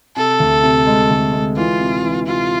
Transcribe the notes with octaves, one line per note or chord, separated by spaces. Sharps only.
C3 A4
D2
C3
G#3
D2
G#3
E3 F4
C3
E3
C3 F4